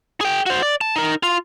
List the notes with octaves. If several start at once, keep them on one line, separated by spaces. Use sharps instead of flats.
G#4 G5
F#4 C5
D5
A5
D#4 A#4
F4